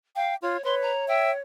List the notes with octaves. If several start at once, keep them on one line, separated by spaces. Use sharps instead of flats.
F5 G5
F4 C#5
B4 C#5 C6
A#5
E5 G5